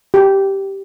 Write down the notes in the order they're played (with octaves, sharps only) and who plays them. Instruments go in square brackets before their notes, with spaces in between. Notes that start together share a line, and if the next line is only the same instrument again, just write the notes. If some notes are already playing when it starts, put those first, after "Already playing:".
[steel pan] G4